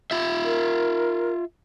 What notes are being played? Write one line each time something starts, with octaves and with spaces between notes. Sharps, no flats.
F4 E5
A#4